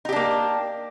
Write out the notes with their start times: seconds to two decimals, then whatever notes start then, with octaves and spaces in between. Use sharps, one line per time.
0.05 D#4
0.09 G4
0.12 D4
0.16 A#3